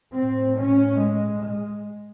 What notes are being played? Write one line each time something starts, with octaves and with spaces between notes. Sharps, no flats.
A2 C4
C#4
G#3
G#3